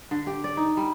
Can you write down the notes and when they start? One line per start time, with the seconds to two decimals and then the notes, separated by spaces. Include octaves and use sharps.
0.11 D3
0.27 G4
0.44 D5
0.57 D#4
0.77 G3